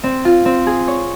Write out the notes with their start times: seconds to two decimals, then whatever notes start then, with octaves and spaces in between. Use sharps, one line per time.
0.04 C4
0.25 F4
0.45 C4
0.67 G#4
0.88 C#5